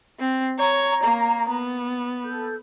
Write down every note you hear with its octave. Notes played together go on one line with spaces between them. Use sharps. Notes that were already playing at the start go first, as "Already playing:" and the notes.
C4
C#5 A#5
A#3
B3
A4 G6